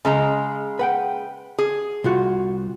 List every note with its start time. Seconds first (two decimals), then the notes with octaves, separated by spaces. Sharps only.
0.05 C#3 G#3 A#5
0.79 B4 F#5 G5
1.58 G#4
2.04 C2 F4 F#4